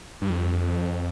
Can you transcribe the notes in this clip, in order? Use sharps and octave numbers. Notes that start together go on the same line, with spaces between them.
G2
F2